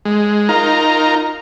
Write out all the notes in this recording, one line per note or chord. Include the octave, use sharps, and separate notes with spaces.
G#3
D#4 F4 A#4 A#5